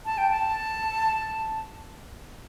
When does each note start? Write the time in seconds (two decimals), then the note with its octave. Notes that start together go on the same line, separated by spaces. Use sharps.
0.05 A5
0.18 G5
0.31 A5